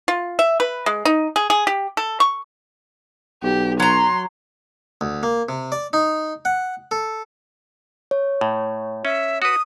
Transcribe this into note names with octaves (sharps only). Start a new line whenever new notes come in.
F4
E5
B4
G#3
D#4
G#4
G#4
G4
A4
C#6
B1 G4
F#3 A#5 C6
D2
A#3
C3
D5
D#4
F#5
A4
C#5
A2
C#4 E5
F#4 B4 D#6